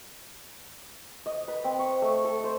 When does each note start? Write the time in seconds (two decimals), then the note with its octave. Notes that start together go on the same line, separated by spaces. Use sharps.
1.26 D#5
1.48 B4
1.64 C4
1.79 C#6
2.02 A3
2.25 A4
2.44 C5